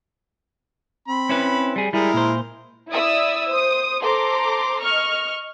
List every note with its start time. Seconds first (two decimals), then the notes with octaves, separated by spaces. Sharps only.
1.08 C4 B5
1.29 C#4 E4 B4
1.76 G3 G#4
1.93 G3 G#3 E4 G#4 A#4
2.14 A#2 C5
2.90 E4 D5 E5 D#6 E6
3.49 C5 D#6
4.01 A4 C5 A#5 C6 D6
4.83 D#5 C#6 F6